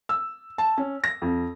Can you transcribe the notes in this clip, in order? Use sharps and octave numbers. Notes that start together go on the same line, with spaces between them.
E6
A5
C#4
A#6
F2